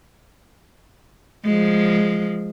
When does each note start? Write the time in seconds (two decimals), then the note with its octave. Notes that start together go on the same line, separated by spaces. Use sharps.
1.44 F3 G#3